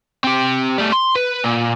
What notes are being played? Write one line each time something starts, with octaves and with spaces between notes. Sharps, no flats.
C4 G4
G3 A3
C6
B4
A#2